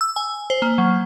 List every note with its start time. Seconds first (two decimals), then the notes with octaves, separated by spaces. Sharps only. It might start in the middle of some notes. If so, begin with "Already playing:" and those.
0.01 E6
0.16 G#5
0.50 C5
0.62 A#3
0.78 F#3